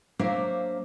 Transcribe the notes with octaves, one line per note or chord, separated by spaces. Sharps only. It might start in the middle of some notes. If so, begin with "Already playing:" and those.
F#3 A#3 D4 C5 E5 F5